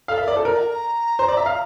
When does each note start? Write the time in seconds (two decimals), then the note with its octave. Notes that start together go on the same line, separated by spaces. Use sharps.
0.08 A4 F5
0.18 E5
0.21 A#4
0.28 D5
0.33 A4 C5
0.45 A#4 D5
0.58 A#5
0.70 A#5
1.19 C5
1.28 D5
1.37 E5
1.46 F5